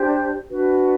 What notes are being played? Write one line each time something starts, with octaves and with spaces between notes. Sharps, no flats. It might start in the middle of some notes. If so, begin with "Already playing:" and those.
Already playing: D4 G4 C5
D4 F#4 B4